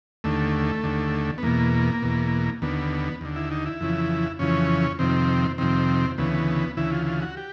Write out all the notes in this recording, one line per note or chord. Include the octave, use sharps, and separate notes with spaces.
D#2 D3 A3
D#2 D3
B3
E2 B2 A#3
E2 B2
D#2 D3 B3
D#2 D3
E4
D#4
E4
F2 C#3 E3
F2 C#3 E3 C#4
F2 C3 D#3 C4
F2 C3 D#3 C4
D2 C#3 E3 B3
D2 C#3 E3 E4
F4
F4
F#4
G4